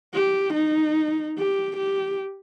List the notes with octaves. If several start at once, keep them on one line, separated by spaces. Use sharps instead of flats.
G4
D#4
G4
G4